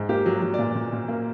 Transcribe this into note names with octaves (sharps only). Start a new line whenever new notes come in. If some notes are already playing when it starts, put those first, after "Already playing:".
Already playing: G#2
A#3 G4
F#3
F#3
A#2 D5
A#2
A#2
A#3